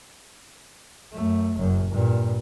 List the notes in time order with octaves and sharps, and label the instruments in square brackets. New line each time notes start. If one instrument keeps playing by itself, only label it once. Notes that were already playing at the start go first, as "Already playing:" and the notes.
[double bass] F#2 A3
F#1 F#2
G2 A#2